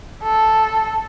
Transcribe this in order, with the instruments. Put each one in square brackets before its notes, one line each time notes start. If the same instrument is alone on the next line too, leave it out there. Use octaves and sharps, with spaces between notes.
[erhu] A4